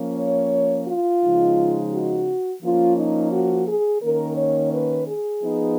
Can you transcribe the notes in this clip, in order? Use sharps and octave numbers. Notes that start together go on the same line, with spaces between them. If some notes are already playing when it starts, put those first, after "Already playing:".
Already playing: F3 A#3 C#4
C#5
F4
C#3 F3 G#3 D#4
F#4
F3 A#3 C#4 F4
D#4
F#4
G#4
D#3 A#3 C#4 A#4
C#5
B4
G#4
F3 B3 D#4